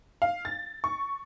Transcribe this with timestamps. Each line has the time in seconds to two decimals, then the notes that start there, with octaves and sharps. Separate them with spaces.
0.22 F5
0.45 A6
0.84 C#6